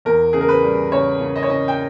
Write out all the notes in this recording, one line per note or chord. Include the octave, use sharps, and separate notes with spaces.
E2 A#4
C#3 G#4
A#4
B4
G3
C#3 C#5
C#3
D#5
C#5
C#3 D#5
G5